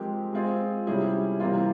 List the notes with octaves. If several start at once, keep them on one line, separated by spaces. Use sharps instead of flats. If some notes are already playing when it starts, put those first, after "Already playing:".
Already playing: F3 G#3 C4 G4 A#4
G#3 C4 F4 G#4
C3 G3 C#4 E4 G#4
C3 E3 G3 A#3 F4